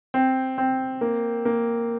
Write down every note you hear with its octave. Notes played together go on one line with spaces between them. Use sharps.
C4
C4
A#3
A#3